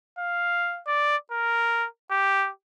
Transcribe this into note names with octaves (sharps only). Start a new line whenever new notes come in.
F5
D5
A#4
G4